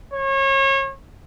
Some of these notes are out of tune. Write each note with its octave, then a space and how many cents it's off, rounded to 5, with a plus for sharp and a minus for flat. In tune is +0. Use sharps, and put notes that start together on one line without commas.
C#5 -30